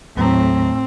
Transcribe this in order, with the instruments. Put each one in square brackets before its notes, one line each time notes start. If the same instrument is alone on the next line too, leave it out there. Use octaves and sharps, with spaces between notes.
[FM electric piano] D#2 F#3 A#5 [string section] A2 [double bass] C4